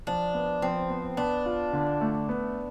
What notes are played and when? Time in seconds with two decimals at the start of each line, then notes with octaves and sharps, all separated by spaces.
0.07 F3 D4
0.34 B3
0.62 F3 C4
0.90 B3
1.17 B3 D4
1.46 F4
1.73 D3
2.01 A3
2.29 B3